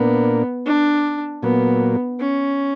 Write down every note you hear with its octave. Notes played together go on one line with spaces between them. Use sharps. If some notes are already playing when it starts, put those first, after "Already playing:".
Already playing: A#2 A#3 B3 D4 A#4
D4
A#2 F#3 A#3 B3
C#4